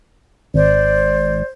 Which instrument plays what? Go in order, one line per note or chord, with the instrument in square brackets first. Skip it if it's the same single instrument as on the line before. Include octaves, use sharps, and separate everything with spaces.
[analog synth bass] G#1 [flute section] C5 D5